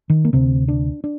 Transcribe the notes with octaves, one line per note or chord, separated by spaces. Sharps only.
D#3
A#3
D2 C3 C4
D4
D4